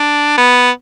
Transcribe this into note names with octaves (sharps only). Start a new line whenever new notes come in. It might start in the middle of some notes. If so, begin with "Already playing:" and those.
Already playing: D4
B3